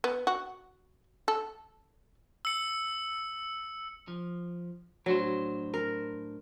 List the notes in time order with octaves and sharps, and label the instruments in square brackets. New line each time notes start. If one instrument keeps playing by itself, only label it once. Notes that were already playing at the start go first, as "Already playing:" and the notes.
[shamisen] B3
F#4
A4
[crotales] E6 C#7
[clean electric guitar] F3
[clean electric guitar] A2 D4 C5 [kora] F#3
[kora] A#4